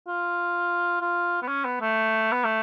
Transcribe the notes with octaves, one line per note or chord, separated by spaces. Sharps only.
F4
F4
B3
C#4
B3
A3
B3
A3